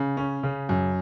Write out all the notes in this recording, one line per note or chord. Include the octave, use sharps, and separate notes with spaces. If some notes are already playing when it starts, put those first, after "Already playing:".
Already playing: C#3
C#4
C#3
F#2